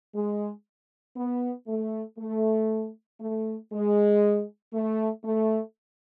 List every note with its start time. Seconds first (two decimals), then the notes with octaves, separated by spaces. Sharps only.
0.15 G#3
1.17 B3
1.68 A3
2.19 A3
3.21 A3
3.73 G#3
4.74 A3
5.25 A3